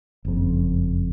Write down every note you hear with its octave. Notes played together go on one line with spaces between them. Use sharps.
F#1 F2